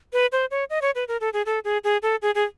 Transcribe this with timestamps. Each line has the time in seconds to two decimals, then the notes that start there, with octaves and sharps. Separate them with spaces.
0.13 B4
0.32 C5
0.51 C#5
0.70 D#5
0.82 C#5
0.95 B4
1.08 A#4
1.21 A4
1.33 G#4
1.46 A4
1.65 G#4
1.84 G#4
2.03 A4
2.22 G#4
2.35 G#4